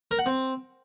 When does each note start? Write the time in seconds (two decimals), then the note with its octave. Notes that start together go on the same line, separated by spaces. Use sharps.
0.11 A#4
0.19 F#5
0.26 C4